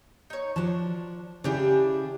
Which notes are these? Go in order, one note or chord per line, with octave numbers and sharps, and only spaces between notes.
D#4 C#5
F3 D4 F#4 A5
C#3 D4 E4 G4 G#4